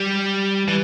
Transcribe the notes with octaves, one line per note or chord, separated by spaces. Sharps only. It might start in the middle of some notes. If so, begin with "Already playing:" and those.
Already playing: G3
E3